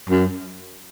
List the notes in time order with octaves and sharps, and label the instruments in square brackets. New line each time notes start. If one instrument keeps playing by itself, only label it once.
[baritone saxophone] F#2